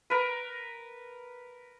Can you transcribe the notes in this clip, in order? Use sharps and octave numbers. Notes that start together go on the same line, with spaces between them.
A#4 B4